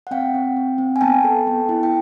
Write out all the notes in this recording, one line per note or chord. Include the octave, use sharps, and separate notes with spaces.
F#5
C4 F5 G5
C4
C4
C4
G#5
B3 G5 A5
A4
B3
E4
G5